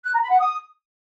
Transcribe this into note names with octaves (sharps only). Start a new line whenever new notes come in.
F#6
A#5
B5
F#5
D#6